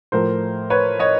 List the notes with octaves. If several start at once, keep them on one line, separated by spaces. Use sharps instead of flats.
A2 F3 A3 A#4 C5
B4 C#5
C#5 D#5